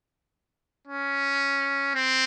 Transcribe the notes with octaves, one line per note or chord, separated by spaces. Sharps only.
C#4
C4